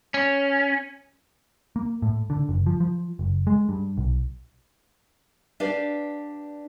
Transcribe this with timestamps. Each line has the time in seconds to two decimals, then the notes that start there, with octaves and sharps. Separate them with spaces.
0.14 C#4
1.76 A#3
2.02 A2
2.30 D3
2.49 F#1
2.66 F3
2.80 F3
3.19 F#1
3.47 G#3
3.69 G2
3.97 B1
5.60 D4 G4 B4 D5 F5